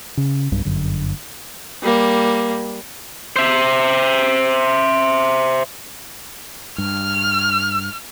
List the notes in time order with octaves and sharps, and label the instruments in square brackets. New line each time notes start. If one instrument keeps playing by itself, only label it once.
[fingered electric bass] C#3
B1 G2
G1 F#2 D3
[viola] G3 A#3
[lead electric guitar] C5 E5
[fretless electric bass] G2 [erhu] F6